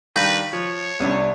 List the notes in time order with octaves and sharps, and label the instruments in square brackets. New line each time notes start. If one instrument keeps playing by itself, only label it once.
[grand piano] D#3 G3 D4 [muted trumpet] B4 [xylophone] F5 G6 A#6
[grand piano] F3 [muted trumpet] C#5
[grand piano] C2 C3 [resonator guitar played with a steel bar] B3 C#4 D4